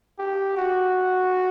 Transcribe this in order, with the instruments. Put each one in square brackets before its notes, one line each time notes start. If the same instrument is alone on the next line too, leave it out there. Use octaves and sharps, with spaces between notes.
[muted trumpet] G4
F#4